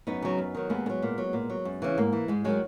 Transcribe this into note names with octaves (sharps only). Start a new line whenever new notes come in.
F#2 B3 D#4
C#3 F#3
F#2
D#3 F#3
D#2 G#3 B3
D#3
F#3
A#2
F#3
A#2
F#3
F#2
C#3 E3
G#2 A#3
E3
G#2 G#3
D#3 F#3 G#3